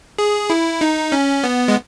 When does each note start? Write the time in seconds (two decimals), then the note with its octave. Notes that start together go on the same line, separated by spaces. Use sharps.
0.18 G#4
0.50 E4
0.81 D#4
1.12 C#4
1.44 B3
1.68 G#3